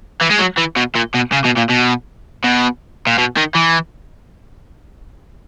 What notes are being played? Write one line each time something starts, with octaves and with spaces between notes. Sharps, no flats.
E3
G#3
F#3
E3
B2
A#2
B2
C#3
B2
A#2
B2
B2
A#2
B2
D#3
E3